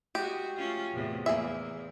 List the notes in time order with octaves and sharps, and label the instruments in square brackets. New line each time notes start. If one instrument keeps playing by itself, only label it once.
[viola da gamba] G#3 F#4 [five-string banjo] G4
[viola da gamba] A3 C#4 F4
E2 A2 C3
[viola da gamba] E2 [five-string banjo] A#3 G#4 E5